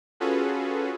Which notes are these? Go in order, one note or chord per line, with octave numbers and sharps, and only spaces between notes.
C#4 F4 F#4 G#4 A4 B4